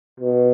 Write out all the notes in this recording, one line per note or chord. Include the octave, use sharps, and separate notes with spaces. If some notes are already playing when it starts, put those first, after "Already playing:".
B2